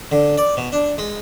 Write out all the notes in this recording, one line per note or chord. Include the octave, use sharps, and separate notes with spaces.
D3
D5
B2
D4
G#3